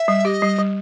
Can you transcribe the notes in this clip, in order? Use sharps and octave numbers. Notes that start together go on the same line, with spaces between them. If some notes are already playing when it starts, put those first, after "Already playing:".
Already playing: E5
G3
G4 D#5
G3
G3